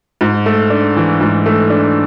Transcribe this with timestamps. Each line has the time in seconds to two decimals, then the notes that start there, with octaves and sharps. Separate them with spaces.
0.21 G#2
0.46 A3
0.70 D4
0.96 E3
1.21 G#2
1.46 A3
1.70 D4